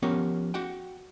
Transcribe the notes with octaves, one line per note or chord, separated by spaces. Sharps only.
F3 B3 C#4 G4 A#4 C#5
F#4 F#5 G5